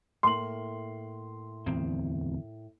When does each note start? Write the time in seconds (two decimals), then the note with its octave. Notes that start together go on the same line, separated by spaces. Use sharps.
0.23 A2 A#3 C6 F#7
1.66 D1 E2 C4